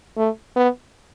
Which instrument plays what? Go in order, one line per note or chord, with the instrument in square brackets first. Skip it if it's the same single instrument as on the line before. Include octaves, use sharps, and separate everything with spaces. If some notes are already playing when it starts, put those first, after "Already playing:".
[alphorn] A3
B3